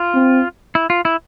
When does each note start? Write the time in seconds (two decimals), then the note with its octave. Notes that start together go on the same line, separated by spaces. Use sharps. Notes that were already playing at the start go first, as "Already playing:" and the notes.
Already playing: F4
0.14 C4
0.75 E4
0.90 F4
1.05 E4